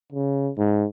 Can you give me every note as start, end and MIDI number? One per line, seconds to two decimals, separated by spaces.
0.12 0.51 49
0.58 0.85 44